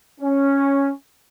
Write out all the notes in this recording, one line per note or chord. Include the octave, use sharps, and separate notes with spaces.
C#4